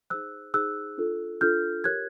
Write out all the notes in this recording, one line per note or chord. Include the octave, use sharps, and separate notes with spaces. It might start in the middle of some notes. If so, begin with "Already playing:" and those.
D#4 G#4 C5 E6 F#6
D#4 G#4 C5 E6 F#6
D4 F4 A4
D4 F4 A4 F6 G6
G4 A#4 C#5 F#6 G#6